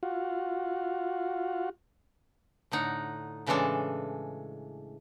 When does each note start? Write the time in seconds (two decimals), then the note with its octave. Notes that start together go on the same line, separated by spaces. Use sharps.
0.03 F4 F#4
2.71 A2 D3 D#4 F#5
3.46 A2 C#3 E3 G#3 D4 A4